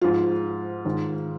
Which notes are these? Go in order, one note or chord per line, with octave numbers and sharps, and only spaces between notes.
G#2 F3 F4
G#2 D#3